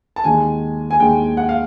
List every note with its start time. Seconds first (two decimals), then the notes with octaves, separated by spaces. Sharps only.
0.16 A5
0.24 D#2 D#3 G#3 G#5
0.91 G#5
1.00 D#2 D#3 G#3 G5
1.37 F#5
1.49 F5